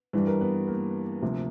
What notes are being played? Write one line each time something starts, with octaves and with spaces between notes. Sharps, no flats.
G2 E3 G3 B4
A#4
B3 B4
A#3 A#4
D2 C3 F3